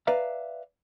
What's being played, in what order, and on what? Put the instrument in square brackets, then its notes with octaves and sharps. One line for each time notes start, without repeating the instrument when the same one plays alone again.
[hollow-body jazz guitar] B4 D5 E5 F5 A#5